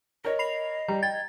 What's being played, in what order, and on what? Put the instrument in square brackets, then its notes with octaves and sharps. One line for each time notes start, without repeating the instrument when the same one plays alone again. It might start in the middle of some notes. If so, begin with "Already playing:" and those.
[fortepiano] A#4 C#5 [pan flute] D#5
[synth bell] B5 C7 F7
[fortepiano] G3 [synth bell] A#5
[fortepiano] G5 [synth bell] G#6 A6